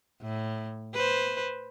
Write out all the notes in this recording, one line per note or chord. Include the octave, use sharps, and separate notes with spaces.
A2
B4 C5